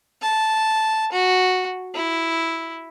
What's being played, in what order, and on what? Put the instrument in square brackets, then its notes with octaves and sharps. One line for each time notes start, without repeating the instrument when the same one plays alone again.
[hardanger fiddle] A5
F#4
E4